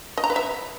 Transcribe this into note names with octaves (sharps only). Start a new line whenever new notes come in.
D#5
A#5
B4
E5